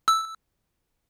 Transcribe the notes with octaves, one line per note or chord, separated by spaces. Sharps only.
E6